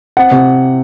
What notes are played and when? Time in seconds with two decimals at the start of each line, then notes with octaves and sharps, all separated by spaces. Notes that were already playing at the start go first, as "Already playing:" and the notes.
0.17 C4 F#5
0.31 C3